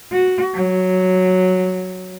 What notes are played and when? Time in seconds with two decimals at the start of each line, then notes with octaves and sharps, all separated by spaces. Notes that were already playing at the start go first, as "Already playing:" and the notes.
0.12 F#4
0.54 F#3